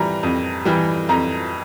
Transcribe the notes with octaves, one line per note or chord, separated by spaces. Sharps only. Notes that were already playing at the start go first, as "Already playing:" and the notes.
Already playing: E3 G3 A#5
F2
E3 G3
F2 A#5